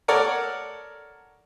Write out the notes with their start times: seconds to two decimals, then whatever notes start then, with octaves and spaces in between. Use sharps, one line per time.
0.08 A4 A#4 C#5 D5 F#5